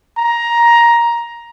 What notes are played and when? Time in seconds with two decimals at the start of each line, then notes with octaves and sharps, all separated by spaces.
0.17 A#5